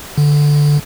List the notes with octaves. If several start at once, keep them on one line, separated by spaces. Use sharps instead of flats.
D3